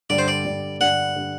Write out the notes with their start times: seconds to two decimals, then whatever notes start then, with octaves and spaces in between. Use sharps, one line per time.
0.10 G2 D3 G3 D5
0.18 C5
0.28 D5
0.45 G2 D3 G3
0.80 G2 D3 G3 F#5
1.16 D3 G3